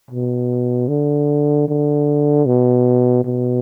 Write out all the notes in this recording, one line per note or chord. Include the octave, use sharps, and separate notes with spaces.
B2
D3
D3
B2
B2